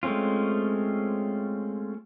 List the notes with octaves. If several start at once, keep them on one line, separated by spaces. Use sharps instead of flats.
G#3 A3 C4 C#4 F4